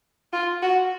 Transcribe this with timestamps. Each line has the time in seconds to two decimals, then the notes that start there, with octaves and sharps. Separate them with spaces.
0.33 F4
0.62 F#4